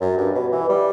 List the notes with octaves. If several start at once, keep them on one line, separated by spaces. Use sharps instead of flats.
F#2
G2
B2
E3
G3